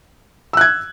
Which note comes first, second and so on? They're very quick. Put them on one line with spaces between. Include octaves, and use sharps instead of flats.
E6 F#6 G#6